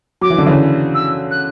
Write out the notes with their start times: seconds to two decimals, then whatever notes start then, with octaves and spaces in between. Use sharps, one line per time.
0.21 F#3 D6
0.30 E3
0.38 D3
0.46 C#3 E3
0.94 E6
1.31 F#6